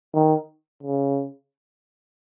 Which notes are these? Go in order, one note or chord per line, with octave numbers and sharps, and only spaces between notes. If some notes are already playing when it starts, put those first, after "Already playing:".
D#3
C#3